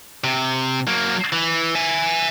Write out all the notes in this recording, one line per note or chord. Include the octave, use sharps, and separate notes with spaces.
C3
F#3 A#3
E3
E5 G#5